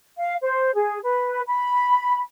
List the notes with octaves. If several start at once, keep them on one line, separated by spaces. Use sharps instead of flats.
F5
C5
G#4
B4
B5